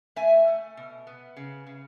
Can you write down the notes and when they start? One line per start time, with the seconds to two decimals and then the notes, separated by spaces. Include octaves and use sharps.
0.16 A3 E5 G#5
0.47 A3
0.77 B2
1.07 B3
1.36 C#3
1.66 C#3